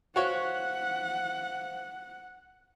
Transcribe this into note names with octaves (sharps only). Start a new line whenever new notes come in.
F#4 C5 C#5 F5 F#5